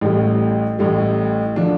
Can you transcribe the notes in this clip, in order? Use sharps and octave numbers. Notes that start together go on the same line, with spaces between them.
A1 A2 G3
A1 A2 G3
D3 F3 D4